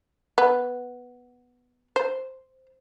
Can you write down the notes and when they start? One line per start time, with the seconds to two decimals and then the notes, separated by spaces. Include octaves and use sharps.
0.38 B3
1.96 C5